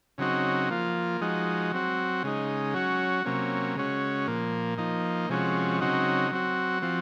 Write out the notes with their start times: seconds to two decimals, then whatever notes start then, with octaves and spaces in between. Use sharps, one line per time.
0.18 C#3 F#3 C4 D#4 F#4
0.70 F3 A#3 F4
1.21 F3 G#3 D#4 F#4
1.72 F#3 C4 F#4
2.23 C#3 G#3 D#4
2.74 F#3 C#4 F#4
3.25 C3 F#3 A#3 C#4
3.75 C#3 G#3 C#4 F#4
4.27 A#2 F3 A#3
4.78 F3 A#3 D#4
5.29 C3 F3 G#3 C#4 F#4
5.80 C#3 F#3 C4 D#4 F#4
6.31 F#3 C4 F#4
6.82 F3 C4 F#4